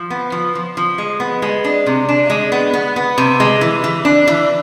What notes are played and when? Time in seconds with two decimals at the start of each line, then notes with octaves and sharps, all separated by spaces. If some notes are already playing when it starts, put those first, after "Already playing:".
Already playing: F3
0.10 B3
0.32 F3
0.55 F3
0.77 F3
0.98 G#3
1.20 B3
1.42 G#3
1.64 D4
1.86 C3
2.09 D4
2.30 G#3
2.52 B3
2.73 B3
2.96 B3
3.18 C3
3.40 G#3
3.61 E3
3.84 E3
4.05 D4
4.28 E3